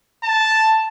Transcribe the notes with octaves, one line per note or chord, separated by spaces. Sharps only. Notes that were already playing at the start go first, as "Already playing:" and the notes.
A5